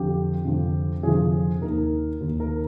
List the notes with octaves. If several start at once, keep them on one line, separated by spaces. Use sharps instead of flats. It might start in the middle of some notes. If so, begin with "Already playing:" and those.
Already playing: F2 D3 F3 G4
F2 D3 F3
F2 D3 F3 G#4
D#2 D#3 A#4
D#2 D#3
A#4